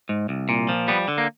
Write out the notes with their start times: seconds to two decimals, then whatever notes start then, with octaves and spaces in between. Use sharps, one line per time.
0.09 G#2
0.29 C2
0.49 A#2
0.69 F3
0.88 G3 B3
1.08 D3
1.18 A#3